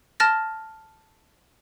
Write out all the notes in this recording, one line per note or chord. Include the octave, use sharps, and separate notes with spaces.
A5 F6 A6 A#6